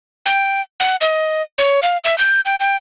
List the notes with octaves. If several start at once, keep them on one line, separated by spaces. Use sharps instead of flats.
G5
F#5
D#5
C#5
F5
E5
G6
G5
G5